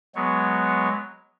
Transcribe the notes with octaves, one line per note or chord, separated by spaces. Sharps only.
F#3 G#3 B3 C#5